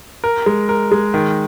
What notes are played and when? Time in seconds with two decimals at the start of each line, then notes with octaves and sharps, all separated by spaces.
0.24 A#4
0.46 G#3
0.69 A#4
0.92 G#3
1.14 D#3